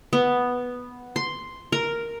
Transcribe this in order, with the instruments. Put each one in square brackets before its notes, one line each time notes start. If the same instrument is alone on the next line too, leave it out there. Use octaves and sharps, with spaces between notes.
[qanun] B3
C6
A#4